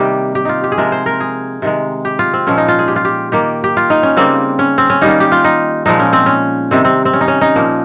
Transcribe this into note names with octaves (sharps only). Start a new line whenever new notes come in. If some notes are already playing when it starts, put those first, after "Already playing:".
Already playing: C3 D#3 G3 A#3 G4
G4
D#4 F4
G4
G#4
C3 F3 G#3 A#4
C5
A#4
G#4
C3 D#3 G#3
G4
F4
C4
A#2 F3 G#3 C#4
D#4
F4
G#4
G4
F4
G4
D#3 A#3 G4
G4
F4
D#4
C#4
C#3 G3 A#3 C4
C#4
C4
C#4
D#3 G3 A#3 D#4
G4
F4
D#4
A#2 F3 G#3 D#4
C#4
C4
C#4
C3 D#3 G3 C4
C4
C4
C#4
D#4
C#4
D#4
A#2 F3 A#3